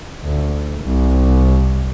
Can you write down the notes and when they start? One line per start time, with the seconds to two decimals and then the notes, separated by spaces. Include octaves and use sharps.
0.24 D2
0.82 C2